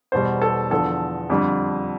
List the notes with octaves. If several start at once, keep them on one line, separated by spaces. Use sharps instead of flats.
E2 B2 G3 C5
A4
E2 D3 F3 A4
F2 D3 G3